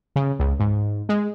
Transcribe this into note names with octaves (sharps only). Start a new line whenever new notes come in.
C#3
C#2
G#2
G#3